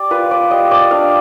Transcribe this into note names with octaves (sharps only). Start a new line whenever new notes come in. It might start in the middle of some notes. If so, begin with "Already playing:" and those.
Already playing: G3 D5
F4 B4
D5
G3 D#5
D5
D4 F5